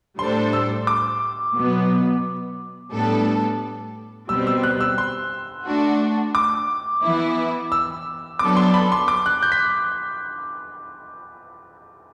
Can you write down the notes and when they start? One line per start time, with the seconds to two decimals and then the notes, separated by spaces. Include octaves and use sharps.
0.19 A2 G3 D4 A4 C5 C6
0.53 E6
0.87 D6
1.55 B2 F#3 B3
2.92 A2 G3 B3 D4 A4
4.29 B2 G3 C4 E6
4.47 E6
4.64 F#6
4.81 E6
4.98 C6
5.66 A3 D4 F#4
6.35 D6
7.03 E3 B3 E4
7.72 E6
8.39 F#3 B3 D4 A4 D6
8.57 C6
8.74 B5
8.92 C6
9.08 D6
9.26 F#6
9.42 G6
9.52 B6